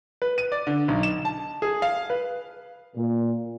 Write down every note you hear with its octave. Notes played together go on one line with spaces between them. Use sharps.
B4
D#7
D5
D3
B1
E7
A5
G#4
F5
B4
A#2